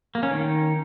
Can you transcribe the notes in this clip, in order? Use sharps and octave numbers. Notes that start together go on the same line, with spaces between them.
A#3
C#4
D#3